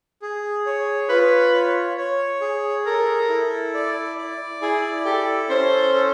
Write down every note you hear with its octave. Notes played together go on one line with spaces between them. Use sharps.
G#4
C#5
F4 B4
C#5
C#5
G#4
A4 A#4
E4
D5
D5
E4 G#4
G4 A4
C#4 C5
A4